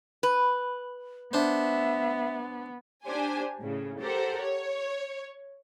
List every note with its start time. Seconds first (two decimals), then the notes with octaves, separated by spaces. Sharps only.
0.23 B4
1.33 B3 D4 C5 E5
3.05 D4 G4 C5 G#5
3.59 A2 C#3
4.00 G4 A4 A#4 C5 F#5
4.40 C#5